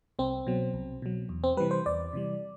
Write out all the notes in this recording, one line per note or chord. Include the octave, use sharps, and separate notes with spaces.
C2 C4
B2 F#3
C2
B2 F#3
E2
C4
C3 E3 G3 B4
C5
E2 D5
C3 E3 G3